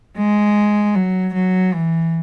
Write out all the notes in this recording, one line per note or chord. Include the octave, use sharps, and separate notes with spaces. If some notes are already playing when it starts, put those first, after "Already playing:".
G#3
F#3
F#3
E3